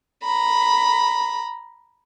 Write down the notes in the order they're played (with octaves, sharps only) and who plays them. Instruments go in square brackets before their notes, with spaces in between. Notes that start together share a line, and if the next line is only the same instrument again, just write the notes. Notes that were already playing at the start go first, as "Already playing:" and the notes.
[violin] A#5 B5